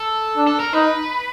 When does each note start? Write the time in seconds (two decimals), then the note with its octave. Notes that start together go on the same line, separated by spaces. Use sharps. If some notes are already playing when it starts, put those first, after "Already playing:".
Already playing: A4
0.37 D4
0.47 A4
0.60 A#4
0.73 D#4 B4